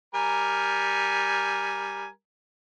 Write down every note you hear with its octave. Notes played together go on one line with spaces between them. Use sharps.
G3 A#4 G#5